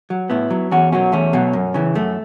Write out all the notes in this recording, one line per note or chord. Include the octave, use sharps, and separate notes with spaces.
F#3
A2 B3 E4
F#3
E2 C#4 F#4
B2 F#3 C#4 F#4
E2 A3 C#4
B2 F#3
F#2
C#3 E3
F#2 A3